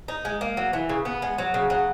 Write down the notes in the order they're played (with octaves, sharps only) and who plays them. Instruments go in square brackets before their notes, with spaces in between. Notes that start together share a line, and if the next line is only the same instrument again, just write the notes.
[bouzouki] D#4
G#3
A#3
F#3
E3
C#3
B3
G#3
F#3
C#3
F#3